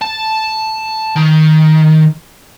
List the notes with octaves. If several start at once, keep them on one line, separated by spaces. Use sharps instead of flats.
A5
D#3